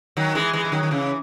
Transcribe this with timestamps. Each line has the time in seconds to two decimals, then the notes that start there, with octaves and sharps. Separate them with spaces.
0.17 D#3 F#3
0.35 E3 G#3
0.53 E3 G#3
0.65 G#3
0.72 D#3 F#3
0.83 D#3
0.91 C#3 E3